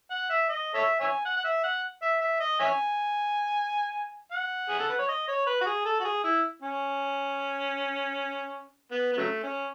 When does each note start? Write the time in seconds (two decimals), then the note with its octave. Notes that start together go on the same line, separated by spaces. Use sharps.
0.11 F#5
0.30 E5
0.49 D#5
0.74 A4 C#5 E5
1.00 C#5 E5 G#5
1.26 F#5
1.37 F#5
1.45 E5
1.64 F#5
2.02 E5
2.21 E5
2.40 D#5
2.60 C#5 E5 G#5
4.32 F#5
4.69 G#4
4.79 A4
4.89 B4
4.99 C#5
5.08 D#5
5.28 C#5
5.46 B4
5.61 F#4
5.66 G#4
5.85 A4
6.00 F#4
6.04 G#4
6.24 E4
6.62 C#4
8.91 B3
9.12 B3
9.17 C#3 F#3 A3
9.43 C#4